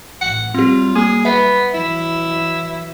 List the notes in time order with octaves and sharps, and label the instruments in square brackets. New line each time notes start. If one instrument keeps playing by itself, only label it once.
[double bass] A1 [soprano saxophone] F#5
[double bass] F#3 G3 [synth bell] C4 G4 [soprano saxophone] F4
[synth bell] A#3 [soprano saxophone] G#4
[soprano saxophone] B3 [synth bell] E5
[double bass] E3 F#3 [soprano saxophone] E4